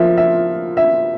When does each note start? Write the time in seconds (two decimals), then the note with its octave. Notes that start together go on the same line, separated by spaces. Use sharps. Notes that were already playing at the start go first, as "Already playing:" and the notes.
Already playing: F3 A#3 E5
0.17 E5
0.77 E5